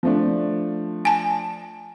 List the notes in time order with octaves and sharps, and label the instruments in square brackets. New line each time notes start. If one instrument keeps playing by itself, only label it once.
[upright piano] F3 A3 D4
[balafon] G#5 A5